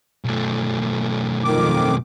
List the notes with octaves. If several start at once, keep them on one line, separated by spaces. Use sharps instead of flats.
B1 A3
F2 D#3 D6